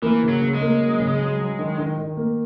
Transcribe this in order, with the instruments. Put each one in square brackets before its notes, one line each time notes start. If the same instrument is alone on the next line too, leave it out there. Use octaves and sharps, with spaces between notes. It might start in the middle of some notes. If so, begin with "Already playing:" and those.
[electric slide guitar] E3 [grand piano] A#3
[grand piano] C#3
[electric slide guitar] F#3
[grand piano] C#3
[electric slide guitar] G#3
[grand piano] A#3
F#3
C#3
F#3
F#3
D#3
D#3
D#3
A#3